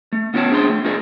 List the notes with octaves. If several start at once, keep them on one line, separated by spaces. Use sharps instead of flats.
A3
B3 C#4 F4 C#5 G5 A5
D4 G#4 C5 A5 C6
A3
C4 D#4 F4 G#4 A#4 D5